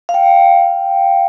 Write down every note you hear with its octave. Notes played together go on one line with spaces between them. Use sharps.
F5
G5